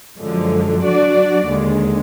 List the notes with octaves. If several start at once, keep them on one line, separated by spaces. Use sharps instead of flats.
F#2 D3 F3 G#3
F#3 D4 F#4 D5
D#2 D3 G#3